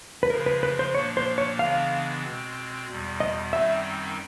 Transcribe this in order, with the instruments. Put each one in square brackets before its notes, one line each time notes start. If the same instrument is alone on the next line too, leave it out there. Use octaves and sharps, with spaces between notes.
[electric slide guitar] B4
[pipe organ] C#3 F3 G#3 [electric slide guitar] A#4
[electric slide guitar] B4
B4
C5
[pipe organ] A#2 F3 A#3 D4 [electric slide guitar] C#5
[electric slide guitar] C5
C#5
[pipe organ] C#3 E3 G#3 B3 D4 [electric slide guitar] F5
[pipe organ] B2 G#3 C4
E2 B2 G3
[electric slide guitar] D#5
[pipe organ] F#2 D#3 G3 C4 D#4 [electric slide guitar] E5